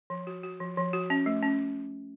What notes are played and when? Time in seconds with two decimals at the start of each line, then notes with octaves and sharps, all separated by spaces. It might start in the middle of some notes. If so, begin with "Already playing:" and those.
0.10 F3
0.27 F#4
0.43 F#4
0.60 F3
0.77 F3
0.93 F#4
1.10 C#4
1.26 A3
1.43 C#4